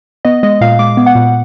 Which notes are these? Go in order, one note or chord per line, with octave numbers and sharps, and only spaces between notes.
B3 D#5
G#3 D#5
A#2 F5
G#3 D6
B3
F#5
A#2